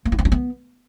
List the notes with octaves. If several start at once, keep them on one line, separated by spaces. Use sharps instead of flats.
A#3
E4
C4
D4
B3